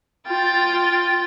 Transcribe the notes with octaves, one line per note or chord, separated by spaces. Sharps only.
F4 G5 A6